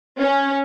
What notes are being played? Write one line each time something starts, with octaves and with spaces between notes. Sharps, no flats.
C#4